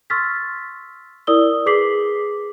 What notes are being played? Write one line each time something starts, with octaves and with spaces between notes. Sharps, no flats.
C6 C#6 E6 F6 A6 B6
E4 A#4 D5 D#6 E6 G7
G#4 B4 D6 B6 C7 F#7